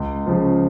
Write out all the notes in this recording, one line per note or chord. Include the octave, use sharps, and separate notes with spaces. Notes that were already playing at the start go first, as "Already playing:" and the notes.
Already playing: C#2
C#3 F3